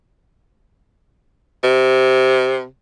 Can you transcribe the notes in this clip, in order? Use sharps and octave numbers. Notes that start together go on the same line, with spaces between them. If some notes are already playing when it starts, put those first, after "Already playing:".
C3